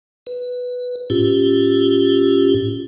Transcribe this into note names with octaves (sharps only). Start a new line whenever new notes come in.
B4
A2 C#4 F4 G4